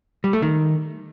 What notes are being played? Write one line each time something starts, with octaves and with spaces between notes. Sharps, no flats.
G3
A3
D#3